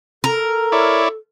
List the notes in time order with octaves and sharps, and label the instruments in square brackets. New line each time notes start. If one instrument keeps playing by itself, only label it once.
[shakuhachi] A4 [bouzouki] A#4
[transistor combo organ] E4 C#5 D5